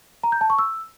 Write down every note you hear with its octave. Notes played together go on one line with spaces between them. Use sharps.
A#5
G6
A5
C#6
E6